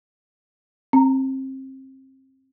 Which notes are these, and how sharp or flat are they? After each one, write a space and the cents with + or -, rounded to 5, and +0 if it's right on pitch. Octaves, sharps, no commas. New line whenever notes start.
C4 +25 A#5 -10